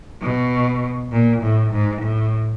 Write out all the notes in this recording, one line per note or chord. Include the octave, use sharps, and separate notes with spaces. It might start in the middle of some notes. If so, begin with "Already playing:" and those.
B2
A#2
A2
G#2
A2